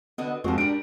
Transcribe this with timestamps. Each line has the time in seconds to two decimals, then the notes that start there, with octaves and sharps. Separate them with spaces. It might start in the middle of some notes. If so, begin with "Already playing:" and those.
0.18 D3 B3 F#4 D#5
0.44 F2 F3 G#3 C4 F#4
0.58 G3 D4 A#4 D7